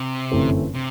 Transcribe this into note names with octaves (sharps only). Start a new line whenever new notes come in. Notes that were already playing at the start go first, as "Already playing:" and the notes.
Already playing: C3
G1 F#2 E3 A3 C4
C3